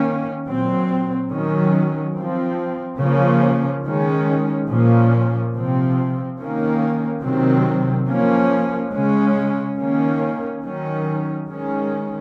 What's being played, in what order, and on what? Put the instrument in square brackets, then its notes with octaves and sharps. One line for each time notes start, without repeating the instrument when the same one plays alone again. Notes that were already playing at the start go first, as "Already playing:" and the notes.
Already playing: [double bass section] D#3 A#3 C#4
A#2 F#3 C4
D#3 F#3 C#4
F3 C4
C#3 F3 A#3 C#4
D#3 G#3 C#4
A#2 F3 A#3 C#4
C3 F3 C4
D#3 A#3 C#4
C3 D#3 F#3 C4
F3 A#3 C#4
C#3 G#3 C#4
D#3 A#3 C#4
D#3 F#3 C#4
D#3 G#3 C#4